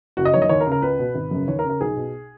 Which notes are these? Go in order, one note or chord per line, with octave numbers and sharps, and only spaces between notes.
F#1 F#4
D#5
F#2 D#3 C#5
D#5
D#2 C#5
A#4
C#3
A#4
C#2 B4
B2
G#1
F#2 C#3
D#2 C#5
A#4
C#3
A#4
B1 G#4
B2